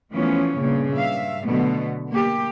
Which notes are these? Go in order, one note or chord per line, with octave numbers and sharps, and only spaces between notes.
E3 F3 A3 B3 C#4
G2 A#2 C#3
G2 E5 F5
B2 D3 F#3 A3 B3
A#3 G4